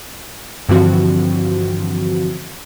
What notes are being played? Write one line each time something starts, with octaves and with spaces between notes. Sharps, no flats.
G2 D3 E3 F3 C4 F#4